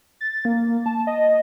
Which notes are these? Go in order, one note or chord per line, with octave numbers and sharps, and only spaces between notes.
A6
A#3
A5
D#5